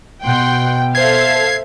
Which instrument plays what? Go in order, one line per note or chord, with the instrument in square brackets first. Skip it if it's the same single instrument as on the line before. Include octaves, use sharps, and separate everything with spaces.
[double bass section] B2 [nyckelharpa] F#5 C6 [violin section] G5
[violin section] A4 E5 F5 [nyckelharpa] C5 [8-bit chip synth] G#6 C7